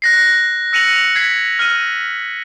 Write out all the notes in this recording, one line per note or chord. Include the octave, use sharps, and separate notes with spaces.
F#6 A#6 C7
E6 A#6 C#7 D#7 F7 F#7
G#6 B6 C7
F6 D#7